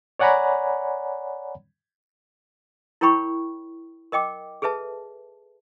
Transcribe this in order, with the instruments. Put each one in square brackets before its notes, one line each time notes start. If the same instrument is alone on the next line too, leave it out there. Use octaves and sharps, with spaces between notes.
[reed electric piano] C#5 D5 F#5 G#5 A#5 B5
[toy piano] E4 A#4 C#5 G5 B5 C#6
A#4 D#5 G5 D6
G#4 A4 B4 E5 A5